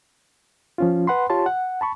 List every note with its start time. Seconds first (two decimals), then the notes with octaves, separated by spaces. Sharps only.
0.78 F3 C#4 F4
1.07 B4 F#5 B5 C6
1.30 F4 G4 C#5 A5 C6
1.46 F#5
1.81 A5 B5 C#6